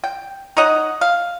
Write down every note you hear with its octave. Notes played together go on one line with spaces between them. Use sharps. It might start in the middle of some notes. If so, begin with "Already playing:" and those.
G5
D#4 C#5 D#5 F#5
F5